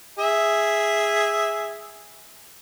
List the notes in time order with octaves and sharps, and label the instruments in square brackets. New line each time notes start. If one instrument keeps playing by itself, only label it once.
[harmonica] G#4 E5